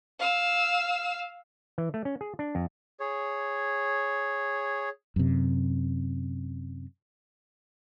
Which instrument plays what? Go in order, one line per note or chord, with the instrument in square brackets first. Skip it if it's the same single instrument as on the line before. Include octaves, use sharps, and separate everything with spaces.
[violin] F5 E6
[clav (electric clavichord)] E3
A3
C#4
G#4
D4
F2
[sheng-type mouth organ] G#4 C#5
[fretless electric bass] F#2 C3